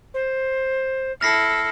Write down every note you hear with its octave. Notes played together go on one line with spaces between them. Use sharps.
C5
E4 A4 F6 A#6 C7